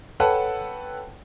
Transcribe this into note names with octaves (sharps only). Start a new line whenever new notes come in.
A4 B4 C#5 F#5 G5 A5